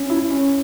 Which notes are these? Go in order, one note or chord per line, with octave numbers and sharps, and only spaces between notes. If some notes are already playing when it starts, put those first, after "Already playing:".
Already playing: C#4
E4
C#4